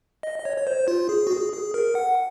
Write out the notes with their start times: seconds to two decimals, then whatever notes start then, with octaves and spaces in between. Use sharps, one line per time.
0.23 D#5
0.39 D#5
0.45 C#5
0.57 C#5
0.67 C5
0.88 F4
1.09 G#4
1.27 F#4
1.31 G#4
1.53 G#4
1.74 A#4
1.95 F#5